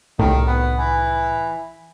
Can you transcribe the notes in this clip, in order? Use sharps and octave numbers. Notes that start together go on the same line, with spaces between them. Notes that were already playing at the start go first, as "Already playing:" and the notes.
C2 A2 D#3
B3
E3